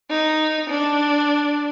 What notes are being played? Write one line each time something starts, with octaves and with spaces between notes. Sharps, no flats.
D#4
D4